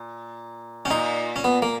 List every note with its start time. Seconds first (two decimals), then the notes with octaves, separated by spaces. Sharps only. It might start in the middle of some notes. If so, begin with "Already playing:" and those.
Already playing: A#2
0.85 B2 C#4
0.90 A#2 D#4
1.36 C#4
1.44 B3
1.62 A#3